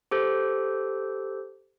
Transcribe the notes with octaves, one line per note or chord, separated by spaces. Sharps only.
G4 A4 C5